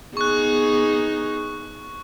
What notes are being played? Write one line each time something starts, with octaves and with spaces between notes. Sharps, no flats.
B3 D#4 G#4 C#6 F#6